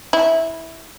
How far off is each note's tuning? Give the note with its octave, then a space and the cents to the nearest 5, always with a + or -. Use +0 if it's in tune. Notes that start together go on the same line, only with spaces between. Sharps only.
E4 -15